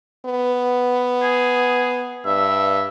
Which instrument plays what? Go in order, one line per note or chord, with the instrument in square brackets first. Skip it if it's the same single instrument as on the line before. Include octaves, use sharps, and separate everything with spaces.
[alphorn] B3
[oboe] G#4
[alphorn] G2 [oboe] E5